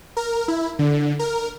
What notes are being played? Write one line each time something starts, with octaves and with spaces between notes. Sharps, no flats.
A#4
E4
D3
A#4